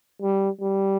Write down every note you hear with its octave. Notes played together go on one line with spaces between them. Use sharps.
G3
G3